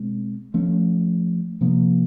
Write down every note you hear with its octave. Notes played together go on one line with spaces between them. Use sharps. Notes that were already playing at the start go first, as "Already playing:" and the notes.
Already playing: B2 G#3 C4
F3 A3 C#4
C3 F3 A#3